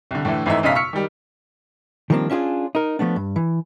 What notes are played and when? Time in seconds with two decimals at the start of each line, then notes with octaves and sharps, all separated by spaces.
0.11 C2 D3
0.25 A2 D3 E3 A3
0.46 G#1 G#2 E3 G#3 A3 E5
0.63 B1 F#2 C#3 D#5 F5 B6
0.75 C#6 E6 F6 B6 C#7
0.93 D#3 G3
2.10 D#3 F3 G3 A#3 C4 D4
2.30 C#4 D4 F4 F#4 G#4
2.75 D#4 A#4
2.99 F3 A3 B3 D4
3.16 G2
3.36 E3